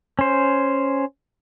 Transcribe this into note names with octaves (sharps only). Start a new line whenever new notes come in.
C#4 C5